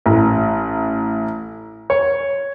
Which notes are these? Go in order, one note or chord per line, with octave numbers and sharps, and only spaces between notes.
A1
C#5